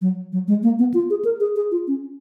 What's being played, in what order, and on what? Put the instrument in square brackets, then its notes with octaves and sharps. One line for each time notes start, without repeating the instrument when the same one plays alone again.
[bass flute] F#3
F#3
G#3
A#3
B3
F4
G#4
A#4
G#4
G#4
F4
C#4